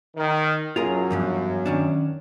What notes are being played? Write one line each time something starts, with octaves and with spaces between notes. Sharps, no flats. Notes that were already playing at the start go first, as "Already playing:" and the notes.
D#3
F#2 F#3 F4 G#4 A#4
E2 G2 F3
D#3 C#4 D4